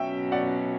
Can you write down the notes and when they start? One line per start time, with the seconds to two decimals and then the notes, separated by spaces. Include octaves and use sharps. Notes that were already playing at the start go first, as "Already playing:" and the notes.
Already playing: B2 F#3 C#4 E5 G5
0.32 D5 F#5